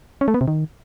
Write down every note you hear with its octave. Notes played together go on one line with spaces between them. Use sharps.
C#4
A3
B3
C3
D#3